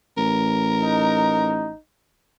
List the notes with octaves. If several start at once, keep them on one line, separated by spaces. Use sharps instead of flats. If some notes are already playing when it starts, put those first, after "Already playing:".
A1 A#4
D#4